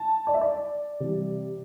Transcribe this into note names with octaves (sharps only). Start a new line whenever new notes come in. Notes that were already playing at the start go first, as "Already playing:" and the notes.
Already playing: A5
D5
E5
D5
C3 E3 G3